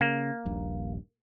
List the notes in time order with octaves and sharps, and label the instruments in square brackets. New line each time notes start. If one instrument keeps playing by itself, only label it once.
[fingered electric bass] C#3 [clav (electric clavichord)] A#3
[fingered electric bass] D#1 A#1 G2